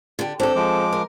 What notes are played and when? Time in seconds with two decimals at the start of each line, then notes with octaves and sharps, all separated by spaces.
0.19 D3 G4
0.40 C4 D4 A4
0.56 F3 G#3 D6
0.92 A#4